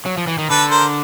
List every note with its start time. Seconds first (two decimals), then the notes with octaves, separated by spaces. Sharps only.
0.06 F#3
0.17 F3
0.27 E3
0.38 D#3
0.50 D3 A4 B4
0.70 A#4 C5